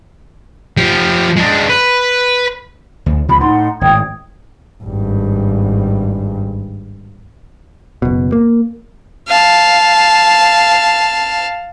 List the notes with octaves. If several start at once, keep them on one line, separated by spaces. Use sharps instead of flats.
F3 G4
G#3 D4
B4
D2
C#2 C3 F3 B5
A2 D#4 F#5 C6
G#1 A2 G5 D#6 G#6
G#1 G2
F#1 B2
A#3
F5 A5